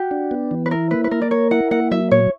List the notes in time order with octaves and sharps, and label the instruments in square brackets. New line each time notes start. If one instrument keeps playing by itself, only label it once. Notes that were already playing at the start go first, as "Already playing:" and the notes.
Already playing: [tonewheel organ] F#4 [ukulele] G4
[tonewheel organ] D4
B3
E3
[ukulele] B4
[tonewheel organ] E4 [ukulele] A#4
[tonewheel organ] A#3 [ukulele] B4
[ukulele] B4
[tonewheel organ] A#3 [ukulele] A#4
[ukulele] D5
[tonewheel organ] A#4 [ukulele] C#5
[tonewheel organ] E4 [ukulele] F#5
[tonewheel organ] A#3 [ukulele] F#5
[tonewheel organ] F#3 [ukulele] E5
[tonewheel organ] A#2 [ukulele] C#5